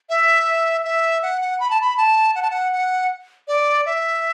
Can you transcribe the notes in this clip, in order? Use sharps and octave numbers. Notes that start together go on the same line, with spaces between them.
E5
E5
F#5
F#5
B5
A5
B5
A5
F#5
A5
F#5
F#5
D5
E5